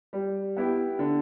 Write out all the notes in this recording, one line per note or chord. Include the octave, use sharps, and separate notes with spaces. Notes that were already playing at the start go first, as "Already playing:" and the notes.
G3
B3 E4 G4
D3